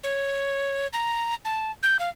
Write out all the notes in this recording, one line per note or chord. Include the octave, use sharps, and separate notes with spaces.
C#5
A#5
A5
G6
F5